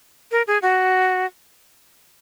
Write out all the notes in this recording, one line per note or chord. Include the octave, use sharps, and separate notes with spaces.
A#4
G#4
F#4